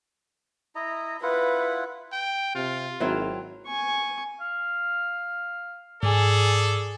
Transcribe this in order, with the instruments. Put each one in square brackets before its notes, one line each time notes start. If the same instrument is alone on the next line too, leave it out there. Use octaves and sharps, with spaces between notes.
[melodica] E4 D#5 A#5
[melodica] E4 F4 F#5 [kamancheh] B4
[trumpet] G5
[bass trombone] C3 [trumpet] F4
[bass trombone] G#1 [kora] F#3 C4 E4
[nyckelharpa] G#5 C#6
[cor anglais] F5
[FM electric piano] G#2 [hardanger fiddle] G#4 [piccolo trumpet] A4 [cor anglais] D5